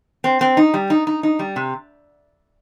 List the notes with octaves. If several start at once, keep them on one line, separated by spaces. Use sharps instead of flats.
C4
C4
D#4
G3
D#4
D#4
D#4
G3
C3